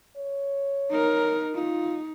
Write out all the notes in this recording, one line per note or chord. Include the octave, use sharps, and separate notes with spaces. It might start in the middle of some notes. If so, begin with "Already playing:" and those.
C#5
D#4 A#4
D#4 F4